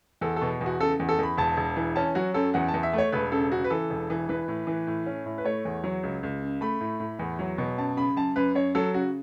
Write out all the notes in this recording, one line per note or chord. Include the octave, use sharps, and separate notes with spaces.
E2 A4
A4
B2
E2
F#4
C#3 A4
E2
A4
E2 B5
E1 A5
E1
E3
C#4 A5
F#3 F#4
F#2 A4
E2 F#5
A5
E2
E5
A3 C#5
E1 B4
C#3 A4
C#3 F#4
B4
E3 A4
E1
E3
E3 B4
A2
E3
A2
C#4
A2
B4
A3 C#5
E2
F#3
C#2
C#2
C#3
A3 B5
A2
A2
E2
F#3
B2
F#2 A5
C#3 B5
F#2 A5
F#2 B4
F#2 C#5
F#3 A4
C#3 F#4